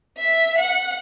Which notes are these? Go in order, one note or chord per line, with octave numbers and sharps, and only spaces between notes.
E5
F#5